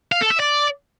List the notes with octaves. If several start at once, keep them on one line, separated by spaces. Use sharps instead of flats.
F5
A4
E5
D5